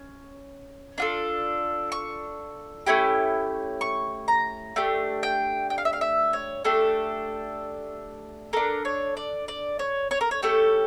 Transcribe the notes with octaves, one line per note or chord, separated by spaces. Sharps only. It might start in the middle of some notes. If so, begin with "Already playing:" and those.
Already playing: C#4
D4 F4 A4
C#6
A3 C#4 E4 G4
C#6
A#5
A3 D4 G4
G5
G5
F5
E5
F5
E5
C#5
A3 D4 G4 A4
D4 A4 A#4
C#5
D5
D5
C#5
C#5
A#4
C#5
A3 C#4 G4 A4